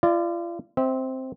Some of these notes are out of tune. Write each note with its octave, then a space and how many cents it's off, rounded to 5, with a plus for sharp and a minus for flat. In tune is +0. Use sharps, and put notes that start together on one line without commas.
F4 -35 D5 +15
C4 +0 E5 -30